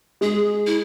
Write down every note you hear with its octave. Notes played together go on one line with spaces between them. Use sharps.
G#3 G#4
E4